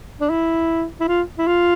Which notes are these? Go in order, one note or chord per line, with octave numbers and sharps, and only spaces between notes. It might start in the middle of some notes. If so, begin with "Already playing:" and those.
D4
E4
E4
F4
E4
F4